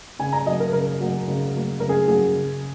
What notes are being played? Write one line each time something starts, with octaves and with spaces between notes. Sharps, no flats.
C#3 G#5
A#5
F#3 A#3 D#5
A#4
C#3 A#4
F#3 A#3
C#3
F#3 A#3
C#3 A#4
G#4
F#3 A#3 G#4
C#3